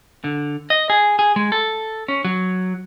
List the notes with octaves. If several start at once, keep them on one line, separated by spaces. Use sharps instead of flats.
D3
D#5
G#4
G#4
G#3
A4
C#4
F#3